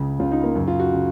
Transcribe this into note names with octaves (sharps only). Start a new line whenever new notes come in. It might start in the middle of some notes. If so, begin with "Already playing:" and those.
Already playing: C#2 C#3
C#2 C#3 F4
D#4
A#3
F#2 C#3
F4
F#4
C#3